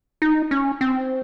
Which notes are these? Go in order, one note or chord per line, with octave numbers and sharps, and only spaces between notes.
D#4
C#4
C4